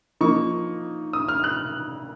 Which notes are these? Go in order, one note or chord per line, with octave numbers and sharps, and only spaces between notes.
F3 A#3 D#4 C#6
D#6
F6
F#6